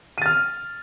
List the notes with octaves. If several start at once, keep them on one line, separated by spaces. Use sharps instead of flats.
F6 A6 D#7